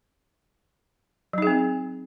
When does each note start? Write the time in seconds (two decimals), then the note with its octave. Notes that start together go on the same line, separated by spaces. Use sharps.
1.33 F#3
1.38 D#4
1.42 G#4
1.47 C4